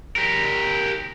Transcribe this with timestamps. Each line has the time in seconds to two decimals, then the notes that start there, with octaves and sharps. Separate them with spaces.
0.16 G4 A#4